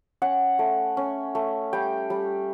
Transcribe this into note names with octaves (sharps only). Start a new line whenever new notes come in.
C#4 F#5
A3
C#4
A3
G3 G5
G3